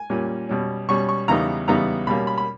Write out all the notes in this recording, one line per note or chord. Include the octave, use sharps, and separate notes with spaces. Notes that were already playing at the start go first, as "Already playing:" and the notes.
Already playing: G#5
A#2 G3 C#4
B2 G3 C#4
B2 G3 C#4 C#6
C#6
E2 C#3 G3 B3 D#4 A#5
E2 C#3 G3 B3 D#4 A#5
B2 G3 A#3 C#4 B5
B5
B5